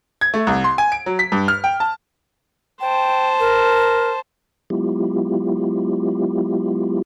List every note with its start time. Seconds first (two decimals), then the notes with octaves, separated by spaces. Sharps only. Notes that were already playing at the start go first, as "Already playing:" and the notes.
0.21 G#6
0.34 A3
0.47 C2
0.64 C6
0.78 G#5
0.92 D7
1.06 F#3
1.19 B6
1.32 G2
1.48 F6
1.64 G5
1.80 A5
2.81 C5 G5 A5
3.40 A#4
4.70 F#3 G#3 B3 E4 F4 G4